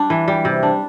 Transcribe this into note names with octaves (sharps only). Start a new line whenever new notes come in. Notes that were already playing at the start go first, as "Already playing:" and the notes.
Already playing: G3 D4
E3
G3
C3
D4